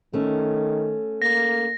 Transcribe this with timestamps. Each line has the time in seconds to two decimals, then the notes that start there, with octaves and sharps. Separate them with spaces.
0.13 D#3 A3 C#4
1.22 A#3 A#6